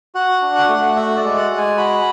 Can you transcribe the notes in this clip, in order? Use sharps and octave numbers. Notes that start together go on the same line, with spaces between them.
F#4 F#5
D4
F#5
A3
F#4 E5
D5
G#3
F#5
G#3
G#5
F#4 B5